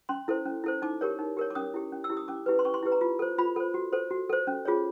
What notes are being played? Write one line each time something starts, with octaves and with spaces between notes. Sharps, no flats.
C#4 C6
E4 A4 C5
C#4
E4 A4 C5
D#4 D6
G4 A#4 C#5
D#4
G4 A#4 C#5
D6
C#4 D#6
E4 G4
C#4
E6
E4 G4
D#6
C#4 D6
E4 G4 B4
C6
C#4 C#6
C6
E4 G4 B4
A#5
F4
A4 C5
F4 B5
A4 C5
F#4
A4 C5
F#4
A4 C5
C#4
F4 G#4 C#5